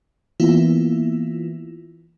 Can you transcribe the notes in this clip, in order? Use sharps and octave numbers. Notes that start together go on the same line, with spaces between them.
E3 A#3 B3 E4 F4